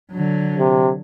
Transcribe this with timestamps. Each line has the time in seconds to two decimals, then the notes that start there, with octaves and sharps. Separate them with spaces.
0.12 D3 F#3
0.58 C3